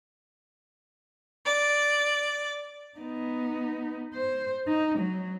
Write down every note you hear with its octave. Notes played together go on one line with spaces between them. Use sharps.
D5
B3 D#4
C5
D#4
F#3